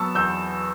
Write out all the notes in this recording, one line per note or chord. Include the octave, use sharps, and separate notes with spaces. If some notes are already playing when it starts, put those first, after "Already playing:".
Already playing: F#3 B3 A5 C#6 E6
E2 E6 G6